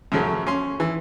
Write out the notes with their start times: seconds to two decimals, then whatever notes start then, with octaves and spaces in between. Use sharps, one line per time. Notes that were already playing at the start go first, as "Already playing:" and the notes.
0.12 F#2 C#3 F3 F#3 A3 C#4
0.47 C#4 C6
0.80 E3